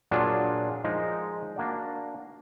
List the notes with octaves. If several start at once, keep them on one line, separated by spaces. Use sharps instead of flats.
A#2 F#3 D4 F4 G#4
F3 G#3 D#4 A#4
A#3 D4 F#4 D5